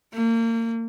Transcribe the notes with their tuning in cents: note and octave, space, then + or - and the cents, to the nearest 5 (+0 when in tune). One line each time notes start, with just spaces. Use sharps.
A#3 -35